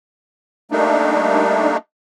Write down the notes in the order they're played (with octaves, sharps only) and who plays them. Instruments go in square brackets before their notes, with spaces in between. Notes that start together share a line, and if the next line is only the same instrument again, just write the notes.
[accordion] G3 A3 A#3 D4 D#4